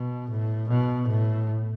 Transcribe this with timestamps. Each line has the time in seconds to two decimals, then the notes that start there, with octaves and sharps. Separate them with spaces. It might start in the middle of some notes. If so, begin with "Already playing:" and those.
Already playing: B2
0.30 A2
0.68 B2
1.08 A2